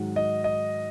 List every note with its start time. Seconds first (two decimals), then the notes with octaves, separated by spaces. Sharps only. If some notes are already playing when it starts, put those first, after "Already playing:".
Already playing: G#2 D#3 F#3
0.16 D#5
0.44 D#5